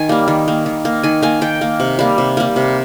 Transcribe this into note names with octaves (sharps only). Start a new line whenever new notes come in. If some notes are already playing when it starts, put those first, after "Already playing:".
Already playing: D#3 G#5
G3 A#3
D#3
A#3
D#3
A#3
D#3 G#5
A#3 G#5
D#3 G5
A#3
C3
G3 A#3
C3
G3 A#3
C3